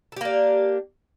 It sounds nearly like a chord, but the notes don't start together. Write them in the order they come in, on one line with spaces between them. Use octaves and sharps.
A4 G4 A#3 D4